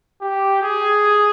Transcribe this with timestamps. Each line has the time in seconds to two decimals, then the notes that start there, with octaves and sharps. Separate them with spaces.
0.21 G4
0.62 G#4